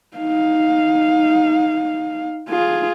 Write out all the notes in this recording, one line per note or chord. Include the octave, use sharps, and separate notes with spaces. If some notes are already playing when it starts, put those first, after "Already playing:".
D#4 F5
F4 G#4